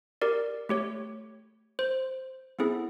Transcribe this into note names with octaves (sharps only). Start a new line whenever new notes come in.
G4 A#4 D5
A3 G4 C#5
C5
B3 C4 E4 G#4 A4